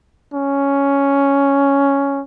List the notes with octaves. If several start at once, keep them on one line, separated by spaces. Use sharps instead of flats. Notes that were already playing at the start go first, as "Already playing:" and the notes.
C#4